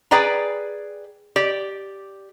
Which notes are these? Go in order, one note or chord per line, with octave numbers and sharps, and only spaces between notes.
G#4 B4 D5 G5 A#5
G4 D5